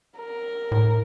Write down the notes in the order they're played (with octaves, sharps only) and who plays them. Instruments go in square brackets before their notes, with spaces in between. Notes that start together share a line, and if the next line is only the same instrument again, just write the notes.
[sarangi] A#4
[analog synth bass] A2